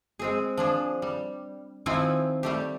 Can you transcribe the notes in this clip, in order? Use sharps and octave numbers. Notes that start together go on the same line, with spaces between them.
G#3 C4 G#4
F3 D4 G#4
G3
D#3 F3 C4 E4 F4 G#5
G3 A3 G4